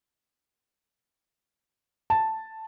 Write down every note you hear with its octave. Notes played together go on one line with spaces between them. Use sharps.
A5